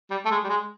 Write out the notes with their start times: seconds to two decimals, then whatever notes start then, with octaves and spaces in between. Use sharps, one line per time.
0.11 G3
0.25 A3
0.31 G#3
0.44 G3
0.49 G#3